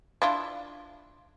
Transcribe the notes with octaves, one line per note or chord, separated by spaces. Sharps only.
D4 E4 F4